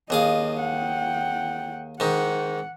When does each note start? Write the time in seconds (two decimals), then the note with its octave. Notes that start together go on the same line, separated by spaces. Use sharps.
0.10 D#2 G#4 D#5 F5
0.60 F#5 G5
2.00 G#2 D#3 F#5